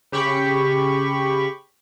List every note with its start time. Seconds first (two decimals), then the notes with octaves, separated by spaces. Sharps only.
0.12 C#3 G4 B5 C#6